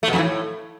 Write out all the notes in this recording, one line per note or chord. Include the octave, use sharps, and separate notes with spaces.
A3
B2
F2
E3
A2